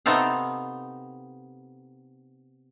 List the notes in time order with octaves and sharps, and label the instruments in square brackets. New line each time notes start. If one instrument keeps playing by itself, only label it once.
[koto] C3 B3 C4 D#4 A4 F5